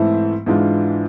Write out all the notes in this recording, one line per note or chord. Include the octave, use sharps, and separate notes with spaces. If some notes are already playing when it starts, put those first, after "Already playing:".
Already playing: G#2 E3 A3 C4 E4
G#2 E3 G#3 D4 F4